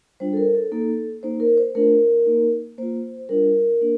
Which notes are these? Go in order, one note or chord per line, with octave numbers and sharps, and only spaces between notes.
G3 D4 F4 C5
A4
A#4
A4
A#3 D#4 A4
A#3 D#4 C5
A#4
C5
A3 D4 F4 A#4
A#3 D#4
A#3 F4 C5
G3 D4 F4 A#4
A#3 D4